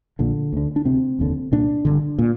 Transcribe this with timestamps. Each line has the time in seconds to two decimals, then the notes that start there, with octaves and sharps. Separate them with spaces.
0.19 A#1 A#2 D3
0.53 D2 D3
0.76 D4
0.85 D2 C3 C4
1.19 F1 D#2 D3
1.52 C2 A#2 D4
1.85 G1 G2 D3
2.19 A#2